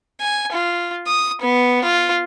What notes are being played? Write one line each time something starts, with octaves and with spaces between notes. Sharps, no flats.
G#5
F4
D#6
B3
F4